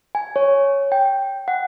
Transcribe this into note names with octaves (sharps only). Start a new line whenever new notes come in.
G#5
C#5
G5
F#5